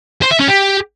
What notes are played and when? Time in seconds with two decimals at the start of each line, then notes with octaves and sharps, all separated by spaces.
0.22 C5
0.31 E5
0.39 C#4
0.48 G4